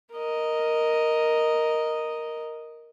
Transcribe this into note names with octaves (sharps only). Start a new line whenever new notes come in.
A#4 D#5